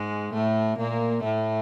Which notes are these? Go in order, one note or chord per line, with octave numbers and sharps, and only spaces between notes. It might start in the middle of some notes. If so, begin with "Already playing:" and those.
Already playing: G#2 G#3
A2 A3
A#2 A#3
A2 A3